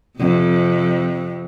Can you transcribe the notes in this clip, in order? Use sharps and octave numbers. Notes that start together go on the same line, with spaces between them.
F2 C3